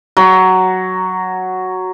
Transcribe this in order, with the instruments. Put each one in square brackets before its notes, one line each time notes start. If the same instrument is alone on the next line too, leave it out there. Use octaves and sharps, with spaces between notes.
[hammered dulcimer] F#3